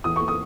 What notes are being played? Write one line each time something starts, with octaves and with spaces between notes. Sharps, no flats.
E2 D#6
C#6
D#6